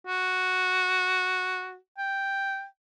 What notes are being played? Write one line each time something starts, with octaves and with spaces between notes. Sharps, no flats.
F#4
G5